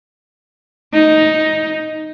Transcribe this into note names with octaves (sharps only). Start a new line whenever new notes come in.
D#4